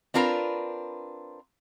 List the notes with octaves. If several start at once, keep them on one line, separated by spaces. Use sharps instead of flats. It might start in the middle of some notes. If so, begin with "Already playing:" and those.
C4 D4 F4 A#4 B4